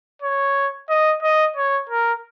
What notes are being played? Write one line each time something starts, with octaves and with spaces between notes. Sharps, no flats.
C#5
D#5
D#5
C#5
A#4